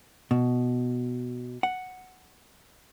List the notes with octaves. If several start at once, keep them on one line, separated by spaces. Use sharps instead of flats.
B2
F#5